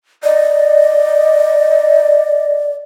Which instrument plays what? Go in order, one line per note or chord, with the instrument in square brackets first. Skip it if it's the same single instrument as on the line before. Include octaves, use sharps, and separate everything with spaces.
[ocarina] D5 [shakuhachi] D#5